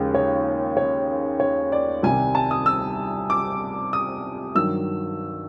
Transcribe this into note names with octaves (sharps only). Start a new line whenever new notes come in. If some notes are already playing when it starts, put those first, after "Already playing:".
Already playing: D#2 C#3 F3 G#3
C#5
C#5
C#5
D5
C2 C3 D#3 G3 G#5
A5
D#6
E6
D6
D#6
G2 D#3 F#3 E6